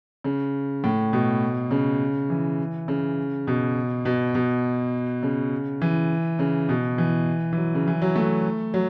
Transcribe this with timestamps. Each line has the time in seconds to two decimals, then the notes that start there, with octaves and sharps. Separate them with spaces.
0.24 C#3
0.84 A2
1.13 B2
1.71 C#3
2.30 E3
2.88 C#3
3.47 B2
4.05 B2
4.35 B2
5.23 C#3
5.82 E3
6.39 C#3
6.69 B2
6.98 E3
7.53 E3
7.57 F#3
7.75 C#3
7.88 E3
8.02 F#3
8.16 A3
8.74 F#3